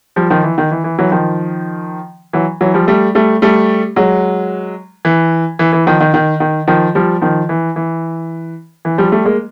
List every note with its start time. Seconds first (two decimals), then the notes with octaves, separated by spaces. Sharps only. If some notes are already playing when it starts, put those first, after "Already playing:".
0.16 F3 G3
0.30 D#3 F3
0.44 E3
0.58 D#3
0.71 E3
0.84 E3
0.99 E3 F#3
1.12 D#3 F3
2.33 E3 F#3
2.61 E3 F#3
2.74 F3 G3
2.87 G3 A3
3.15 G3 A3
3.42 G3 A3
3.96 F#3 G#3
5.05 E3
5.59 E3
5.73 E3
5.86 D#3 F3
6.01 D#3
6.14 D#3
6.40 D#3
6.68 D#3 F3
6.95 F3 G3
7.21 D#3 F3
7.49 E3
7.76 E3
8.85 E3
8.98 F3 G3
9.12 G3 A3
9.25 G#3 A#3